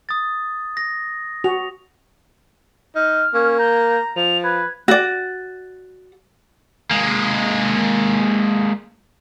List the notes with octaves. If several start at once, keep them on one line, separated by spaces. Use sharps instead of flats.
D#6 A6
A#6
F#4 F7
D#4 F6
A#3 C#4
A#5 G6
F3 F7
B4 G#6
F#4 D5
G#3 A#3